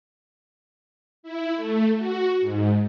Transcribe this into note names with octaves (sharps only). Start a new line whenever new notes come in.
E4
A3
F#4
G#2